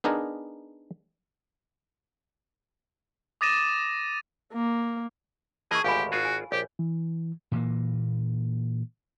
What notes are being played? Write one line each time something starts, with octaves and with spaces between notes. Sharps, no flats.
B3 D4 D#4 G#4 A#4
D6 D#6 A6 A#6 D#7 E7
A#3
E3 A#3 G#4 D#5 A5 C#6
G#1 D2 G#2 G4 F5 G#5 B5
G#1 F4 F#4 G#4
G#5
A#1 G4 C#5
E3
A#2 E3 A#3